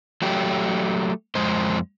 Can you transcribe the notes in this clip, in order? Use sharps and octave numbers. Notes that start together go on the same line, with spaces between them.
F#3 A3 G4
F2 G#3 C5